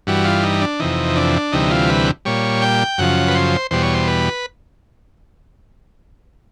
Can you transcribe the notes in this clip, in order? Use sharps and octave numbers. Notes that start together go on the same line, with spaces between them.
G2 E3 G3 F#4
F4
D#4
D4
F2 C3 E3 D#4
D4
D2 C3 E3 G3 D#4
F4
B4
A#2 G3 C#5
G5
F#2 C#3 F3 F#5
B4
C5
E2 B2 G3 C5
C#5
C5
B4